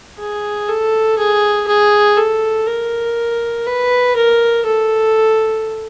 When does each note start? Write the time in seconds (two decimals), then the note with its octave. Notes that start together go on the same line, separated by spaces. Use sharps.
0.19 G#4
0.68 A4
1.18 G#4
1.68 G#4
2.17 A4
2.66 A#4
3.66 B4
4.16 A#4
4.65 A4